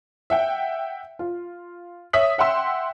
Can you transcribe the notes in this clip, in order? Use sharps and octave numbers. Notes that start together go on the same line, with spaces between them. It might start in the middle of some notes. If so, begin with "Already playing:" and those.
E5 F#5 G5
F4
C#5 E5 D#6 B6 F#7
E5 F#5 G5 C6 E6